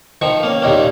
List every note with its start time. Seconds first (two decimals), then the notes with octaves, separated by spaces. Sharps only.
0.21 D#3 F3 C#6
0.43 A#3 C#4
0.62 D#2 A#2 D#3 A#3 C#4